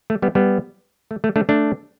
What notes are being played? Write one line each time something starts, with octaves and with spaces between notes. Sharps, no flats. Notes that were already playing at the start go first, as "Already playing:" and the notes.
A3
G3 B3
G3 B3
A3
A3
A3 D4
A3 D4